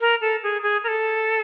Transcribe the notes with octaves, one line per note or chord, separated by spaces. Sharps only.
A#4
A4
G#4
G#4
A#4
A4